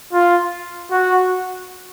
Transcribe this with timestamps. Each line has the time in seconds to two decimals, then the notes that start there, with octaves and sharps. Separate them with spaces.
0.13 F4
0.92 F#4